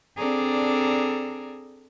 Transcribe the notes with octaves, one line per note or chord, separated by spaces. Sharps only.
C4 D4 G#4 A4 D5 A#5